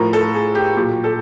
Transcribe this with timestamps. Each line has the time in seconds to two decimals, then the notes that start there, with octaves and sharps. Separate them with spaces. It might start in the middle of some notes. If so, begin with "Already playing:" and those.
Already playing: A2 F3 A#4
0.13 A4
0.34 G#4
0.55 G4
0.77 A#2 F#3 G4
1.04 A4